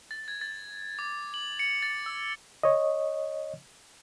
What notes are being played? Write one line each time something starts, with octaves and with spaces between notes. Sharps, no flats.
A6
G#6
A6
D6
F#7
C#7
A6
E6
C#5 D#5